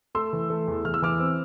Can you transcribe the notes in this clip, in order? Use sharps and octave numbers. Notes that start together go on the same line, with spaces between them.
A3 C6 E6
E3
A3
E2
E2 F6
E6
E3 D6 F6
C4